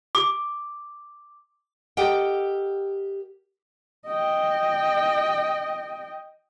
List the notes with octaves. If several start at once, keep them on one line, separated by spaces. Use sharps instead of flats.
D6
G4 A4 A#4 D#5 F#5 G5
D#5 G5